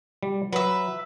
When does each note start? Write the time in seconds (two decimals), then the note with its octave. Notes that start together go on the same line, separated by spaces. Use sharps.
0.23 G3
0.53 F#3 B4 E5